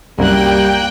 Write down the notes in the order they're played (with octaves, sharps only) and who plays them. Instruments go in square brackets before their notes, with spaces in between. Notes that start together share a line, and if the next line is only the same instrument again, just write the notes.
[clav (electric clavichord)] C2 F#2 [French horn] G3 [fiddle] A#3 F#6 [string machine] G5